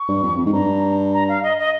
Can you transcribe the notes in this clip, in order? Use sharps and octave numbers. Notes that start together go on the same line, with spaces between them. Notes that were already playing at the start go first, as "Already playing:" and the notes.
Already playing: C#6
G2
F2
F2
G#2
G2 A#5
A#5
F5
D#5
D#5